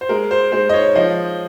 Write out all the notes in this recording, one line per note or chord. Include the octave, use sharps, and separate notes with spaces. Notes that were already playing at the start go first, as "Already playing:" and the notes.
C5
G#3 A#4
C5
G#3 C5
D#5
C#5
F3 D#5